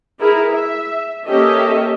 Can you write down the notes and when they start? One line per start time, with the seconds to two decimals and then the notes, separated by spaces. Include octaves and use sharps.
0.20 E4 G#4 A#4
0.52 E5
1.27 A#3 C#4 G4 A4 D#5 E5